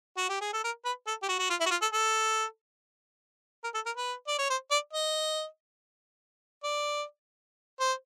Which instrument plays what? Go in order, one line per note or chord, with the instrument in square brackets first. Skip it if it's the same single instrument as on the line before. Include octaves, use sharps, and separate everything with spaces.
[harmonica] F#4
G4
G#4
A4
A#4
B4
A4
G4
F#4
F#4
F4
E4
F#4
F4
A4
A4
A#4
A4
A#4
B4
D5
C#5
C5
D5
D#5
D5
C5